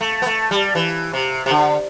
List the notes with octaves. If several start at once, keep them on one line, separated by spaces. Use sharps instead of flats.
A3
B3
A3
G3
E3
C3
C3
D3